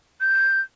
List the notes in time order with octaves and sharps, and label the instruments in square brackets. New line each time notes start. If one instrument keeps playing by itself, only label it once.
[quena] G6